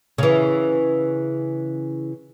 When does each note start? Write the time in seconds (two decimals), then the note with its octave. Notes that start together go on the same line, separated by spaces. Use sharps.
0.18 C#3 E3